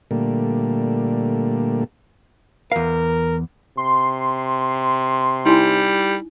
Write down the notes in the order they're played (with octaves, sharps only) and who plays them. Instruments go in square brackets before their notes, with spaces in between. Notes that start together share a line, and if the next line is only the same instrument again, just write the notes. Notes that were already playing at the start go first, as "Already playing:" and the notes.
[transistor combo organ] A#2 D3 G3 A3 A#3
[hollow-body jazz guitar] E2 F5 [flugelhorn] A#4
[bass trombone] C3 [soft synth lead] C6
[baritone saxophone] G3 [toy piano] D#4 E4 G#5